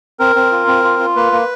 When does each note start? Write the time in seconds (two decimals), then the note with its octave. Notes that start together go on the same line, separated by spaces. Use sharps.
0.19 C4 A#4
0.36 C4
0.51 F4
0.67 C4
0.84 F4
0.99 F4
1.16 A#3 B4
1.33 A#3